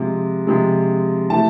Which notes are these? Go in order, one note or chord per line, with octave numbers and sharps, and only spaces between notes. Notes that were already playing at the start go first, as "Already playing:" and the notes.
Already playing: C3 F3 G#3
C3 F3 G#3
C3 E3 A3 A5